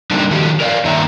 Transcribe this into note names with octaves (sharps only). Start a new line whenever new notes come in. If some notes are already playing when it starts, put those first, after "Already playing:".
D3 G3 A#3 C4 D4 D#4
D#3 F3 F#3 A3 G4
A#4 C#5 D5 F5
G2 D#3 A#3 E5 A#5